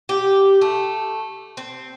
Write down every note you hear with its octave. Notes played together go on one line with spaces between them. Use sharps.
G4
A3
C4